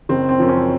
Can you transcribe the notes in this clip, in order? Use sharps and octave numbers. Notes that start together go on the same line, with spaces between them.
F#1 C4
C4
F#2 F3
C#4